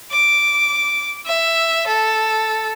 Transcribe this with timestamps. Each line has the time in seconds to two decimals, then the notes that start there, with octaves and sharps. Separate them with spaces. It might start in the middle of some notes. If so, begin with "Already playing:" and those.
0.11 D6
1.26 E5
1.87 A4